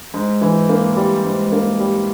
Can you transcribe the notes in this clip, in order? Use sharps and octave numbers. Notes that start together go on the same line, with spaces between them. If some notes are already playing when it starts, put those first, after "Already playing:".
G#2
E3
A#3
G3
G#2
A#3
G3